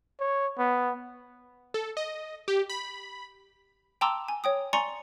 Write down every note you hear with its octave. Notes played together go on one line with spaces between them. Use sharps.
C#5
B3
A4
D#5
G4
B5
G5 A5 A#5 C6 D6 E6
G#5
C#5 G5 D#6
D5 G#5 A#5 C6 C#6 C#7